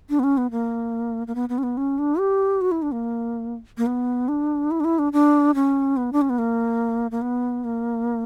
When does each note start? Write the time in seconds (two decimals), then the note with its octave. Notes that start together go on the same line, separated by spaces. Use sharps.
0.09 D4
0.19 B3
0.24 C#4
0.37 B3
0.51 A#3
1.27 A#3
1.35 B3
1.49 B3
1.58 C#4
1.63 B3
1.77 C#4
1.99 D4
2.19 G4
2.61 F#4
2.71 E4
2.82 D4
2.93 A#3
3.78 A#3
3.87 B3
4.28 D4
4.71 E4
4.80 D4
4.84 E4
4.99 D4
5.13 D4
5.55 C#4
5.97 B3
6.13 D4
6.21 C#4
6.30 B3
6.39 A#3
7.11 A#3
7.22 B3
7.64 A#3